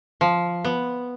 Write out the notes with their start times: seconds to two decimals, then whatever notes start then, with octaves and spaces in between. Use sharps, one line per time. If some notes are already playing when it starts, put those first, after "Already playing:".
0.21 F3
0.65 B3